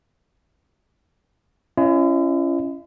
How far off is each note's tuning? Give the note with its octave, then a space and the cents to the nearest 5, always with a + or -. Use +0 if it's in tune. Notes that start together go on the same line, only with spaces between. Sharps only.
C#4 -5 E4 +45 D#5 +0